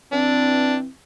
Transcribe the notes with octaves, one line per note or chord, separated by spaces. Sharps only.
E3 C4 D4